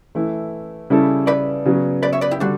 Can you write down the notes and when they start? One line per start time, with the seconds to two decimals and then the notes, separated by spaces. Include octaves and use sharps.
0.15 E3 A3 E4
0.90 C#3 G3 C#4 E4 A4
1.27 B4 D5
1.65 C#3 F#3 B3
2.03 B4 D5
2.12 C#5 E5
2.21 B4 D5
2.31 E4 G4
2.40 D3 G3 D4 F#4